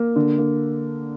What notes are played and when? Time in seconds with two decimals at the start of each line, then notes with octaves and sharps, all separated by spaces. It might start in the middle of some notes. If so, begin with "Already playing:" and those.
Already playing: A#3
0.16 D3
0.38 A#3